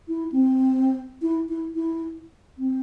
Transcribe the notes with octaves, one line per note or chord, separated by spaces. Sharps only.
E4
C4
E4
E4
E4
C4